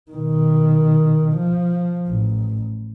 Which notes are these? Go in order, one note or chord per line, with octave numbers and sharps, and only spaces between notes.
B2 D#3
F3
A1